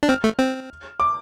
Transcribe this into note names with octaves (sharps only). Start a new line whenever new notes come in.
D4
C4 F6
A3
C4
D6